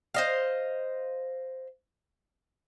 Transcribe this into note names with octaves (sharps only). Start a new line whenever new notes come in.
C5 D#5 F5